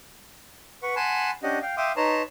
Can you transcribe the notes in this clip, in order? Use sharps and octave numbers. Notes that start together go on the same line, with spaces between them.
B4 F#5 C#6
F#5 G#5 A5 B5 C6
C#4 D4 G4 D#5 F#5
F5 G5
E5 F5 G5 C6 D6 D#6
D#4 B4 C#5 A5 A#5 C6